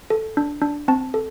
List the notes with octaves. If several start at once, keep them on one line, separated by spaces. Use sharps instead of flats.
A4
D4
D4
C4 A5
A4